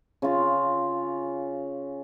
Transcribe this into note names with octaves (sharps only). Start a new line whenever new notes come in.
C#3 F4